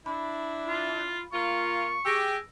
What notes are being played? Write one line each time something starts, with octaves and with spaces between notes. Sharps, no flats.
D4 E4 B5
F4
A#3 F4 C#6
G4 G#4 E6 A#6 D7